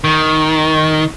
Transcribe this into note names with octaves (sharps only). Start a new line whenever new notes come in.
D#3